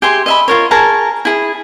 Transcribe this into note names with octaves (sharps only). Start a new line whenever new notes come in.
G4 G#4 E5 C6
D#5 E5 B5
F4 A#4 C#5
G#4 A#4 A5 A#5
E4 G#4